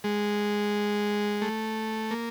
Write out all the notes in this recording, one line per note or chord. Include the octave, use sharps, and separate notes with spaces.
G#3
A3
A#3